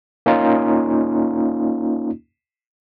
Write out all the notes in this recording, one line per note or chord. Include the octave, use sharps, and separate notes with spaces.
A#3 C#4 D#4 F4